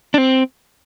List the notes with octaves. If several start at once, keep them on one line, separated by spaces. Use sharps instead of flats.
D4
C4